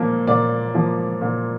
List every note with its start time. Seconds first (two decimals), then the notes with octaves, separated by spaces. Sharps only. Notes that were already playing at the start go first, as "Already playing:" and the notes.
Already playing: A#2 F3 A#3
0.27 A#2 D5
0.74 F3 A#3
1.21 A#2